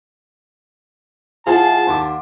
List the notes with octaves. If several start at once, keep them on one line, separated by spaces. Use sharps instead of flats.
F3 E4 F4 G#4 F5 F#5 A5
D#2 C6 D6